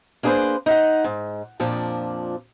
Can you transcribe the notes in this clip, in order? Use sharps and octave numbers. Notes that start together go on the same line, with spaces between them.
A#3 D4 G#4 A4 B4 C5
D#4 F5 F#5
G#2
F2 A#2 F3 D4